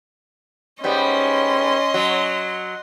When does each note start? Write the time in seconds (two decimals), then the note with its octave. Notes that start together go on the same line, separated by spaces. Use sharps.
0.84 G#2 G3 B3 C#4 D#5 C6
1.94 F#3